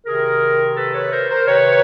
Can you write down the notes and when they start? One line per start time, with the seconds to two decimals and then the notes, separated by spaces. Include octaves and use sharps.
0.06 C3 D#3 G#4 A#4
0.76 A4 B4
0.94 B4 C#5
1.12 A#4 C5
1.29 A#4 C5
1.47 C3 D#3 B4 C#5